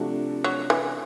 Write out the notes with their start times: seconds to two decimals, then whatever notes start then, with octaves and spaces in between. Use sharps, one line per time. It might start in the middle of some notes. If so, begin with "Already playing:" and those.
Already playing: C3 F3 A3 D4 F#4
0.44 F#3
0.70 E3